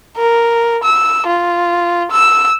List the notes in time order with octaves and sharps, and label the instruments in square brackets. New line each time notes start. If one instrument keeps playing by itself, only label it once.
[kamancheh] A#4
E6
F4
E6